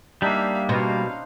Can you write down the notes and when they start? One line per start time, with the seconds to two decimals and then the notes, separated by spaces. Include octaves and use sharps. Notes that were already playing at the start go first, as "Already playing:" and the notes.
0.22 G3 A#3 D4 D#4 E5 F5
0.69 B2 C#4 C5 F5